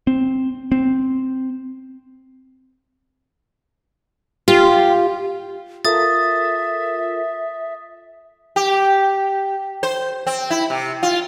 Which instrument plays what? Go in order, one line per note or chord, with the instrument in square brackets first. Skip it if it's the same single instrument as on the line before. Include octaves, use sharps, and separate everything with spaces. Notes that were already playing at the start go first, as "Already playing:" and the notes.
[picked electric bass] C4
C4
[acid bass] F4 [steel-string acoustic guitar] G4
[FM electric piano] F4 A4 A#4 [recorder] E5 [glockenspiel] D#6 A6
[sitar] G4
C5
C4
E4
C3
F4